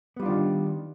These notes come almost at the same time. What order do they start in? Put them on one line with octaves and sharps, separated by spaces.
B3 G3 F4 D4 D#3